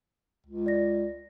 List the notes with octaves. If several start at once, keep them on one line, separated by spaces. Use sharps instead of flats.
C#2
D5 A#6